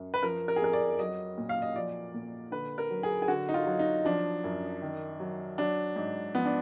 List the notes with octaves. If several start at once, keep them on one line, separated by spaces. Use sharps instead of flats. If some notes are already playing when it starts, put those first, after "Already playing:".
Already playing: F#2
B4
F3 A#4
A#4
G#4
F2 A#4
D5
F#3 D#5
A#2
F5
D#5
F3 D5
A#2
D3 B4
A#4
F#3
G#4
G#4
D3 F#4
D#4
F4
F#3
D#4
F3 D4
F#2
D#3
F#3
F#3 D4
G#2
F3 B3
D4